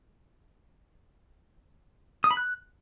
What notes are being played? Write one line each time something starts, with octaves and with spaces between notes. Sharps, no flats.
D#6
B5
F#6